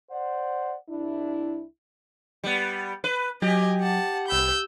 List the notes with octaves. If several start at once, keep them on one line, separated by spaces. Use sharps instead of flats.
C5 D5 F#5
C2 D4 E4
G3 B3
B4
F#3 G4 D#5 G#5
F#5 A5
C2 G5 B5 E6 G6